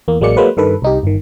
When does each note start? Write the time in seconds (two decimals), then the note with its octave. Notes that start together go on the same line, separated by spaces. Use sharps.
0.08 E2 A#3
0.21 A1 F#3 G#3 A#3 D5 C#7
0.37 F#3 G#3 A#3 B4 C5
0.57 G2 D#3 A4 B4
0.82 C2 D#4 G4
1.03 G1 D#3